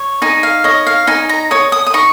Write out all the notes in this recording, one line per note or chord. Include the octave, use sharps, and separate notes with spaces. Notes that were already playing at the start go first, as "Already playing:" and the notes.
Already playing: C#5
D#4 G#5
F5
C#5 D#5
F5
D#4 G#5
A#5
C#5 D#6
D#6
D#6
D#4 C#6